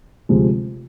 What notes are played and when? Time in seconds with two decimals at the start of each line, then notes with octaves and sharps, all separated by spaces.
0.29 D2 C3 F3 G#3